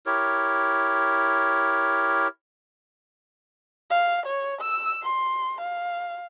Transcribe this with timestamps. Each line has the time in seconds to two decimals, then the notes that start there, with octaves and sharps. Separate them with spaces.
0.06 E4 G4 A#4 C#5
3.91 F5
4.26 C#5
4.61 E6
5.03 C6
5.61 F5